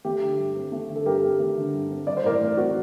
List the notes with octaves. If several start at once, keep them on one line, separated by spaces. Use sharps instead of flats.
A3 G4
D3
G2
C4
A3
D3
A4
G2 G4 A#4
C4
A3
D3
G2
C4
G3 D5
C5
A2 A#4 D5
A1
C4 F#4